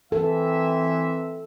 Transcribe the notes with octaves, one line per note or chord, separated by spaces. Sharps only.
E3 C4 A4 E5